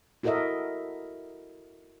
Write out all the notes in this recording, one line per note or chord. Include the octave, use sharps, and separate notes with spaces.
E4 F#4 A4 A#4 D#5 E5